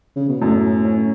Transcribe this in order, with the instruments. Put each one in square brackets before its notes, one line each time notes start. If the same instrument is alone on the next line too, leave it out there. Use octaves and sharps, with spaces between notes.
[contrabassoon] C#3
B2
[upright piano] F#2 [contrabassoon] A2
[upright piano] C#4